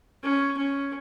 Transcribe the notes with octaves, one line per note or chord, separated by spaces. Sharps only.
C#4
C#4